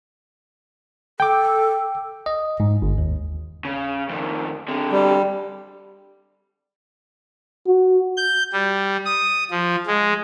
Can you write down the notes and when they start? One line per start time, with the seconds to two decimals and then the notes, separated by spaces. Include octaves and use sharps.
1.20 A4 G5 D6
2.26 D#5
2.60 G#2
2.82 G1
2.98 D#2
3.65 C#3
4.09 F2 D#3
4.68 D3 C4
4.92 G3
7.67 F#4
8.17 G6
8.53 G3
9.05 D#6
9.51 F3
9.87 G#3